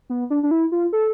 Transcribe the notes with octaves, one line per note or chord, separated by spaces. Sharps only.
B3
D4
D4
E4
F4
A4